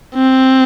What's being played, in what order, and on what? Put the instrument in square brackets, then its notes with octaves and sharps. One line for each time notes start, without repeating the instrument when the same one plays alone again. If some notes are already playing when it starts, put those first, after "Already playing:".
[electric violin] C4